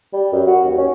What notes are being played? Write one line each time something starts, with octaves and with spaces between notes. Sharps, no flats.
G3
F#2
F#4
D#2
C#4